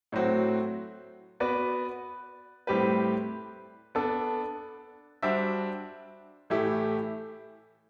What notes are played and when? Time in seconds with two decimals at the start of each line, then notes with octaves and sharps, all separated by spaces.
0.12 A2 F#3 C4 F#4
1.40 B3 F#4 B4 D5
2.67 A2 G3 C4 G4 B4
3.95 B3 D4 A4
5.22 G3 D4 F#4 C5 E5
6.50 A2 E3 A3 E4 G4